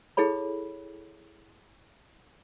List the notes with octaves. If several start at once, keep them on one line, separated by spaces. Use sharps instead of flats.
E4 G#4 A4 C#5 B5